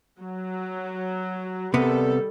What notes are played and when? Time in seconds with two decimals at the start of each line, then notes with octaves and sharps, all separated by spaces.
0.20 F#3
1.74 C3 D#3 G3 B3 A4